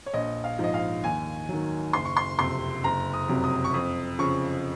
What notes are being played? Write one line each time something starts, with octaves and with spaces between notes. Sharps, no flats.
C#5
A#1 D#5
F5
G#2 F3
D#5
F5
D#2 G#5
D#3 F#3
F#1 C6
C#6
C6
F2 C3 C6
F#1 A#5
D#6
F2 C3 F#3
D#6
C#6
F2 D#6
C#3 F3 C#6